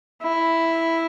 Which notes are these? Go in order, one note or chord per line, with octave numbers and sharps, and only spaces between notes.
E4